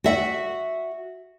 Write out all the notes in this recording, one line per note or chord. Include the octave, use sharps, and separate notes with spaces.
F#4 E5 F#5